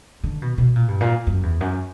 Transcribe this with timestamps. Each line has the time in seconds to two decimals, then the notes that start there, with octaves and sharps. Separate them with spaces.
0.24 D3
0.42 B2
0.58 B2
0.76 A#2
0.88 G2
1.01 A#2
1.27 F#2
1.43 E2
1.61 F#2